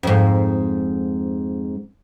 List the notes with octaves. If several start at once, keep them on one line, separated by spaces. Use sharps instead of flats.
F2 G#2